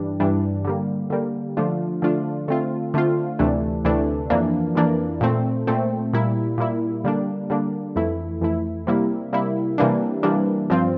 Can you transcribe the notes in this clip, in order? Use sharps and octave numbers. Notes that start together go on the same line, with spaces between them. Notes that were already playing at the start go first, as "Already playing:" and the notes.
Already playing: G2 E3 G3 D4
G2 E3 G3 D4
D3 G3 A#3
D3 G3 A#3
D3 F3 A3 D4 F4
D3 F3 A3 D4 F4
D3 A3 C4 F4
D3 A3 C4 F4
D2 C3 E3 A3 D4
D2 C3 E3 A3 D4
F2 E3 A#3 D4
F2 E3 A#3 D4
A#2 A3 C4
A#2 A3 C4
A#2 G3 A#3 E4
A#2 G3 A#3 E4
D3 G3 A#3 D4
D3 G3 A#3 D4
F2 E3 A3 E4
F2 E3 A3 E4
C3 G3 A#3 E4
C3 G3 A#3 E4
C3 E3 G3 A#3 D4
C3 E3 G3 A#3 D4
G2 F3 C4 F4